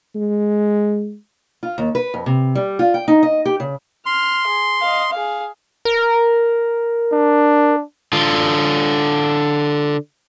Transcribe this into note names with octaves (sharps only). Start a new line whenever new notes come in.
G#3
F4
D#2
B4
F2
C3
G3
F4
G5
D#4
D#5
G4
C#3
C6 F6
G#4
D#5 F5
G#4 F5
A#4
D4
D3 F4